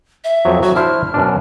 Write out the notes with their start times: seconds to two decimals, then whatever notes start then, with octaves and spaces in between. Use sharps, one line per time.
0.24 E5
0.45 F2 F3 F#3
0.62 F#3 F#4
0.76 D4 E4 C5 F6
1.14 F#2 B2 D4